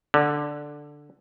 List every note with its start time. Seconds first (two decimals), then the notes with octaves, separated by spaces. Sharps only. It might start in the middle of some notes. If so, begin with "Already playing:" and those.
0.14 D3